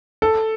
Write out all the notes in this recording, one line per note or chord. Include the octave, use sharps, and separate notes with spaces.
A4